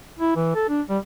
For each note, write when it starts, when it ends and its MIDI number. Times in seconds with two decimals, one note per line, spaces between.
0.19 0.34 64
0.36 0.53 52
0.55 0.65 69
0.69 0.81 62
0.89 0.98 55